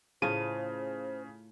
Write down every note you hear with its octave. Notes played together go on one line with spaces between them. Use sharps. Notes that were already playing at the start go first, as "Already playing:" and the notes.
A2 C#3 F4 G#4 C5 D#7